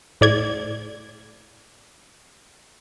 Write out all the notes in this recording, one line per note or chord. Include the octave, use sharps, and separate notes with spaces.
A2 D5 G#6